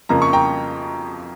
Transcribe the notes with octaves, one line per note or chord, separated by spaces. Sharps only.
F2 C#3 F3 A#3 A#5
C#6
G5 A#5